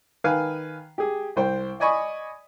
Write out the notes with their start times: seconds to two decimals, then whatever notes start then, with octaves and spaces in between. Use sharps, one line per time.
0.24 D#3 B4 F5 G#5
0.98 G4 G#4
1.36 C2 C5 G5
1.80 D5 D#5 G#5 B5 C#6 D#6